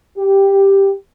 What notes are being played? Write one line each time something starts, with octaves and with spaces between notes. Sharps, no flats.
G4